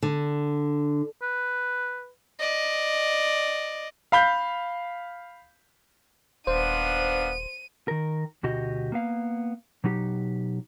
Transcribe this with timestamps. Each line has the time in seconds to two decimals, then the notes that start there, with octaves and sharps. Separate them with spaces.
0.03 D3
1.22 B4
2.40 D5 D#5
4.12 F5 B5 G6
6.47 D#1 B3 D4 C5 F5 D#7
7.88 D#3 A#4
8.43 D2 B2 F#4 G4 D#5
8.92 A#3 B3 F5
9.84 B2 F#3 D#4 G4